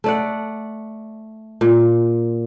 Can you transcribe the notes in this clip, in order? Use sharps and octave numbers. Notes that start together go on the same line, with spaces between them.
A3 D5 F#5
A#2